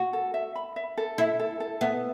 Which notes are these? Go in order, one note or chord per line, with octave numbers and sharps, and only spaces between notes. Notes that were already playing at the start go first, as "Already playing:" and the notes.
Already playing: F#4
A4
E5
B5
E5
A4
E4 E5
A4
A4
B3 E5